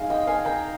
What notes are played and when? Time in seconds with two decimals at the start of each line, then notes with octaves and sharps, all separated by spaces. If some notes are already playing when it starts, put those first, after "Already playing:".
Already playing: G#3 D#4 F5
0.10 D#5 G5
0.27 F5 G#5
0.45 G5 A#5